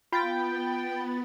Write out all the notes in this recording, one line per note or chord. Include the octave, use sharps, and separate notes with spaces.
B3 F4 G5 B5 A6